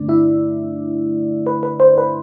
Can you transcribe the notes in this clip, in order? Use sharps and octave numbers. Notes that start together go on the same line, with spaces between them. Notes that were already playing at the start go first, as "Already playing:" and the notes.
Already playing: G2 D3 A3 D4 D5
E4 E5
B4
B4
C5
B4